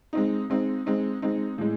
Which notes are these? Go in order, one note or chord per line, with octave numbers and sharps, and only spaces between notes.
G#3 C4 D#4
G#3 C4 D#4
G#3 C4 D#4
G#3 C4 D#4
A2 E3 G#3